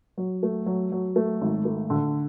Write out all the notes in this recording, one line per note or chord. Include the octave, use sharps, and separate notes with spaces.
F#3
A3
F#3
F#3
A3
G#1
A3
D3